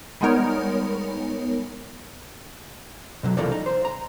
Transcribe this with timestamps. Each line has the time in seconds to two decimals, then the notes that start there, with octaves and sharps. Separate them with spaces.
0.21 G3 G#3 B3 D#4 A#4 C#5
3.23 B2 D3 F#3
3.37 C2 E3 F3 A#3 A4 D5
3.52 D#4
3.66 C5
3.85 A#5